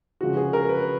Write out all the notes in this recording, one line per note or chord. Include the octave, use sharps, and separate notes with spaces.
C#3 F3 G#3 F#4
G#4
A#4
B4